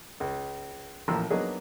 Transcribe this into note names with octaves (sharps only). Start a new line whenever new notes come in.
C#2
A1 A#2 F3 A#3 C6 E6
F#3 A#3 B3 D4 D#4 G#4